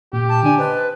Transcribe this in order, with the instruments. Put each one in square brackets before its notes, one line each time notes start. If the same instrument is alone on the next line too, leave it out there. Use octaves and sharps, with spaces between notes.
[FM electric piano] A#2 [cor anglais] G4
[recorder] A5
[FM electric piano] D3 D4 [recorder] G#5
[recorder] B4 [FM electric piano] C5 D#5 A5